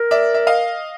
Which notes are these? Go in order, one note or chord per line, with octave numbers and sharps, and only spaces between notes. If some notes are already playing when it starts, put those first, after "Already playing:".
Already playing: A#4
D5 E5
E5
D#5 F5